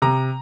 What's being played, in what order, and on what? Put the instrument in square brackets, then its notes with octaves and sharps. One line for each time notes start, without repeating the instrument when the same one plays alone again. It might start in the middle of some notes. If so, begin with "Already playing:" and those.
[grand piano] C3 A#5